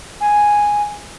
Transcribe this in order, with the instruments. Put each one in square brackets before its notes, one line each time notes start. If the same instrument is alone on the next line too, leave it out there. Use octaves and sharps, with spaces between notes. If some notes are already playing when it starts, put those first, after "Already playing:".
[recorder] G#5